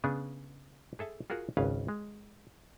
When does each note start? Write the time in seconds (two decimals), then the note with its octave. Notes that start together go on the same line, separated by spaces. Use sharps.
0.04 C#3 B3 D4 G#4
0.99 G#4 A4 E5 A5
1.30 F4 F#4 G#4 A#4 F#5
1.57 G#1 C#2 C#3 C#4 B4 F5
1.88 G#3